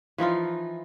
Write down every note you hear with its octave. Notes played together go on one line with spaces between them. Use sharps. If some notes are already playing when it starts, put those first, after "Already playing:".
E3 F3 D#4 F4